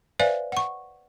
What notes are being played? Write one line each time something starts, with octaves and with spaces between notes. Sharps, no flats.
B4 C5 D5 E5 F5 G#5
F#5 C#6